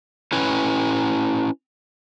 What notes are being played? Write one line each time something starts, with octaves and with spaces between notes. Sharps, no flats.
C#4 E4 B4 C#5